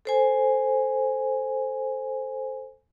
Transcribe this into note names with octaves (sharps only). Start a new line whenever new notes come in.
A4 C5 G#5